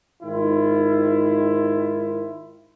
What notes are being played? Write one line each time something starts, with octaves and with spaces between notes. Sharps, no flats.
G#2 D#3 E4 F4